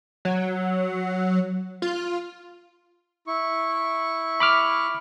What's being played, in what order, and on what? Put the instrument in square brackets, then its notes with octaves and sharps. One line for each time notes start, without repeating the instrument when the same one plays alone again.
[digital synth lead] F#3
F4
[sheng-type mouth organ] E4 C#6
[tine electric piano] B5 D6 F6